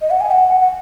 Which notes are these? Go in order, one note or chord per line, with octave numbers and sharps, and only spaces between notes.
D#5
F#5
G#5
F#5
F#5